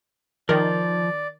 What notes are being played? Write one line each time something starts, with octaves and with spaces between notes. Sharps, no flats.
D#3 F3 A#4 D5